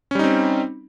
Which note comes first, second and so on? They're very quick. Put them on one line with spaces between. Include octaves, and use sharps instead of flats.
C#4 G3 D#4 C4